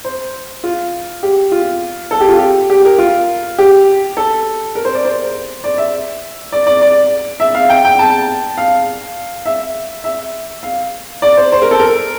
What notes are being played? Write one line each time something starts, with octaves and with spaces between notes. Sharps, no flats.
C5
F4
G4
F4
A4
G4
F4
G4
G4
A#4
F4
G4
A4
A#4
C5
D5
C5
D5
E5
D5
D5
D5
E5
F5
G5
G5
A5
F5
E5
E5
F5
D5
C5
C5
A#4
A4
A#4